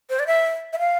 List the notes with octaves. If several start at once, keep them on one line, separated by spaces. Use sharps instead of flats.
C5
D5
E5
E5
F5